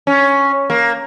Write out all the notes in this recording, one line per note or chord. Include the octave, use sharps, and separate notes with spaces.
C#4
A#3